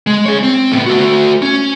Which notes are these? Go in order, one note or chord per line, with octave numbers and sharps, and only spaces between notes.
G#3
G#4 C#5
C4
A2 B3
A3 F#4
C#4